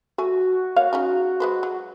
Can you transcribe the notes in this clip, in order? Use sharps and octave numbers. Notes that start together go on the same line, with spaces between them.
A3 F#4 G#5
A#3 C#5 F5
C#4 D#4 G#4
G#3 B4 C5
F#3